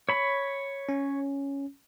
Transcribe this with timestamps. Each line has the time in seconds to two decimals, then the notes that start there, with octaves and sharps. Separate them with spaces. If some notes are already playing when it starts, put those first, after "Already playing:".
0.09 C#5 B5
0.89 C#4